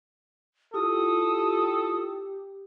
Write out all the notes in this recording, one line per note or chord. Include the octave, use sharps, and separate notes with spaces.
E4 F4 G4 A4 D#6